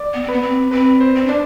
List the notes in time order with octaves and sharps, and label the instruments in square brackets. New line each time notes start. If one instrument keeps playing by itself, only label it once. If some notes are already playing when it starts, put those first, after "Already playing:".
Already playing: [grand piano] D5
[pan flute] B3
C4
[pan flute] B3 [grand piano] B4
[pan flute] C4
[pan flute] C4 [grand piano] B4
[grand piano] C5
[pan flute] C4
[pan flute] D4 [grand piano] D5